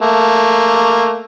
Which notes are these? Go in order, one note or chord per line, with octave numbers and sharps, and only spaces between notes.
A3 A#3